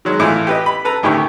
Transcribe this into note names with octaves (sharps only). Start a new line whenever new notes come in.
D#3 F#3 G#3
A2 E3 F4
G4 B4 D#5
B5
A4 B4 A#5
D2 A2 D#3 G4 C#6